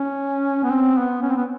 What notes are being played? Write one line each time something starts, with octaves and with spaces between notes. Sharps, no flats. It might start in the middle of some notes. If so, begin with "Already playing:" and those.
Already playing: C#4
B3
C4
B3
C#4
C4
B3